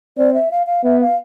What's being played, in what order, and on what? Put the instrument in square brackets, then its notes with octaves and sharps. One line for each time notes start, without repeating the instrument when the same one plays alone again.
[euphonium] C4 [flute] D5
[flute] E5
F5
F5
[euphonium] B3 [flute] E5
[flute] F5